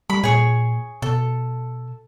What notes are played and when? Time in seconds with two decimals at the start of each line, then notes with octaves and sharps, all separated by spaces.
0.10 G3 B5
0.23 A#2 G#4 C#5
1.02 B2 A4